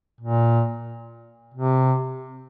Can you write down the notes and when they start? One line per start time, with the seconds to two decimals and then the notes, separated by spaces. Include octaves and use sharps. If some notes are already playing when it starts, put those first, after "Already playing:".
0.21 A#2
1.54 C3